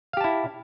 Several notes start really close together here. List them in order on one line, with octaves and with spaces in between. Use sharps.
F5 G4 A5 E4